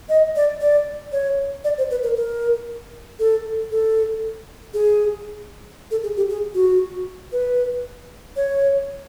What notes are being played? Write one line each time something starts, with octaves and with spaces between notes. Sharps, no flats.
D#5
D5
D5
C#5
D5
C5
B4
A#4
A#4
A4
A4
G#4
A4
G#4
G4
G#4
F#4
B4
C#5